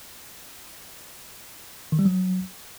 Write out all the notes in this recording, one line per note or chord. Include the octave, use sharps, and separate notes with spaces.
D#3
G3
F#3